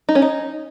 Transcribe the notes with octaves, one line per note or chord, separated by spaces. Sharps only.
D#4
C#4
D#4